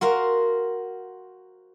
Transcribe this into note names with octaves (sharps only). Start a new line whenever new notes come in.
F#4 A#4 C5 F5